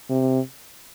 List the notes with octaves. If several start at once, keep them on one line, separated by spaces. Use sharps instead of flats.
C3